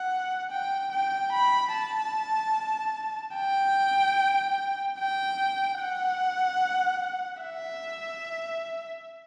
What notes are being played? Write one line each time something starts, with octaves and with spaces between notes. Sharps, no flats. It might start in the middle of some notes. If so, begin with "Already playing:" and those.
Already playing: F#5
G5
G5
B5
A5
G5
G5
F#5
E5